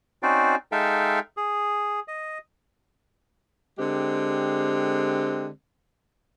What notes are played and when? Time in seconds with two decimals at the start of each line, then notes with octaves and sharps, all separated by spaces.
0.23 C4 C#4 D#4 F#4 C5 D5
0.72 G#3 D#4 A4 E5 F5 G5
1.37 G#4
2.08 D#5
3.79 D3 G#3 C4 G4